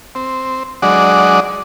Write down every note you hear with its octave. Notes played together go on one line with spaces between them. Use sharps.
C4
F#3 G#3 D4 D5 D#5 F#5